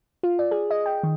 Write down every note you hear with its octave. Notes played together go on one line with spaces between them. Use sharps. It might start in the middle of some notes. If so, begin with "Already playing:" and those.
F4
D5
G#4
D#5
G5
D#3